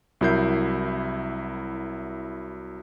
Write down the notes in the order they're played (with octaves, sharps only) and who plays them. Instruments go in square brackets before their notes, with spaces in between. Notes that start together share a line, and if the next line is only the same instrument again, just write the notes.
[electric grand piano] C2 F#3 E4 A#4 G6 C7